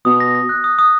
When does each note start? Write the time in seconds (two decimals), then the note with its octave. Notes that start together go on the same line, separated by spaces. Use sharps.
0.05 B2 D#6
0.20 A#6
0.35 A#6
0.49 F#6
0.64 D#6
0.79 D#6